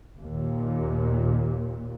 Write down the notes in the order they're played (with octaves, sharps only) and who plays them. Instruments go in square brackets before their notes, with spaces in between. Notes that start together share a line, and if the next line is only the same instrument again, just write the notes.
[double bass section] D#2 A#2